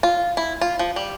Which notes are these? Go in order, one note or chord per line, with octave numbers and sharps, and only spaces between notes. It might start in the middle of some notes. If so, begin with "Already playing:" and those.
F4
E4
F4
F3
G3